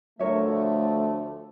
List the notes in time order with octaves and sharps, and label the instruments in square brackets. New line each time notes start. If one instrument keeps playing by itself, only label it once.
[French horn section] D2 F3 A3 [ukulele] A#4 C#5 E5